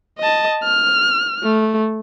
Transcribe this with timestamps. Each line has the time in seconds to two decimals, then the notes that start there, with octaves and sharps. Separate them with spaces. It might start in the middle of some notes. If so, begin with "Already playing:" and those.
0.19 D#5 A5
0.64 F6
1.43 A3